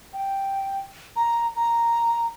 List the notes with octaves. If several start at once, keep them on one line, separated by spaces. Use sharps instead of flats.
G5
A#5
A#5